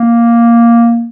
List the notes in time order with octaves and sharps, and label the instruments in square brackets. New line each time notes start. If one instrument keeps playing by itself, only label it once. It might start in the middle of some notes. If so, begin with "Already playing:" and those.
Already playing: [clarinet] A#3